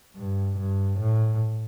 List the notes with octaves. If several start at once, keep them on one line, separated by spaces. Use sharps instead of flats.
G2
G2
A2